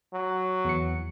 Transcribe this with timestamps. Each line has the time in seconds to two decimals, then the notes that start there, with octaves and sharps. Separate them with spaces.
0.13 F#3
0.65 E2 C#7